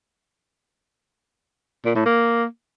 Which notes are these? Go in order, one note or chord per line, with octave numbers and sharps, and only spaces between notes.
A#2
A2
A#3